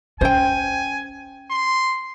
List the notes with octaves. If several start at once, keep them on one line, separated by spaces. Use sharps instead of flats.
C#4 C5 G5 G#5
C6